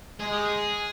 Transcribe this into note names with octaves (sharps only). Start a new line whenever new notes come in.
G#3 G#4
G4
G#4